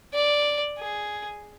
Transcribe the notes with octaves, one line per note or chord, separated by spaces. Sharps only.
D5
G#4